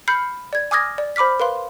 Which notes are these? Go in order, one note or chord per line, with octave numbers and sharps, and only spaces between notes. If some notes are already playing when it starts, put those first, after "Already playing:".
B5 F6 G6 C7 C#7
D5 G#6
G#5 D6 D#6 F6 G#6 A#6
D5
C5 B5 D6 F6 B6
A#4 B4 F5 C6